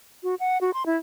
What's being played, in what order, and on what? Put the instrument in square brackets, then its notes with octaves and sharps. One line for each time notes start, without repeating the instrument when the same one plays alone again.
[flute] F#4
F#5
F#4
C6
E4